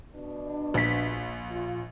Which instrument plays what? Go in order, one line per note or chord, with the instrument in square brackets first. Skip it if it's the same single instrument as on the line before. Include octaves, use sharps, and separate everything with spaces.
[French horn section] B2 D4
[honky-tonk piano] A#1 B6
[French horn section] F4